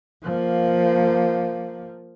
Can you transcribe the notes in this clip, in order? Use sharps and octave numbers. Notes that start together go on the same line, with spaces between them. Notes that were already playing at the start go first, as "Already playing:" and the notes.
F3 A#3